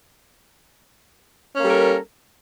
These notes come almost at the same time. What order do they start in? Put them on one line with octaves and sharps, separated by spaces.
C#4 A#3 G3 A4 A#4